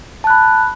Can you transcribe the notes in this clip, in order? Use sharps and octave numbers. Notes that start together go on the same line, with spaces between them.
A5 B5 F#6